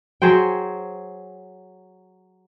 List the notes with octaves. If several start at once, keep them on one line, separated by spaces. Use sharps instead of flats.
F#3 G#4 C5 G5